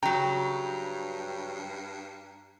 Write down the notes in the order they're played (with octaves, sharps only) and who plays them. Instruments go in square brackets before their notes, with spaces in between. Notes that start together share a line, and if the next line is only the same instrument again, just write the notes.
[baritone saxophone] G2 [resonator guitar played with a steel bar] C#3 F#3 [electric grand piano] G5 [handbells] A#5